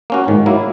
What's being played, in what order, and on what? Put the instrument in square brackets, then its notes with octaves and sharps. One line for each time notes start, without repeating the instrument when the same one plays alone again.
[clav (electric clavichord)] A#3 C#4 F#4
[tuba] G#2 [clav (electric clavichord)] D#3
[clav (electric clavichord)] F#3 A#3 E4